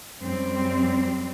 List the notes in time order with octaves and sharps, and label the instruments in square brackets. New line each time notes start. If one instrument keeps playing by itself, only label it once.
[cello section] F#2 G3 C4